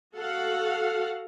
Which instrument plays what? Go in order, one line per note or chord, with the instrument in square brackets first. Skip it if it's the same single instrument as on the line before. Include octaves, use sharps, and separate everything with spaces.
[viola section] F#4 A4 F5 F#5